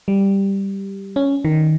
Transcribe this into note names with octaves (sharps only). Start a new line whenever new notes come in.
G3
C#4
D#3